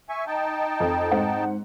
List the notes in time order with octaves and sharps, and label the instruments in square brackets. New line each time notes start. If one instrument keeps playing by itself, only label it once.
[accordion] E5 G#5 C#6
D#4 G5 A5
[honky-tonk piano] F2
G#2 C4 F#5